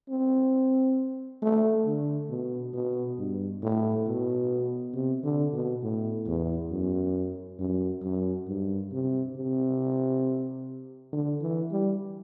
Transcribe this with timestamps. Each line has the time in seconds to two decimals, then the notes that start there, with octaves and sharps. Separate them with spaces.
0.10 C4
1.42 A3
1.86 D3
2.30 B2
2.74 B2
3.18 G2
3.63 A2
4.07 B2
4.94 C3
5.24 D3
5.53 B2
5.83 A2
6.27 E2
6.71 F#2
7.59 F#2
8.03 F#2
8.47 G2
8.92 C3
9.36 C3
11.13 D3
11.42 E3
11.72 G3